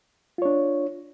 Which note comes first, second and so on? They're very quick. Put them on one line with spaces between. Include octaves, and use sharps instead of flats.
F4 C#5 D4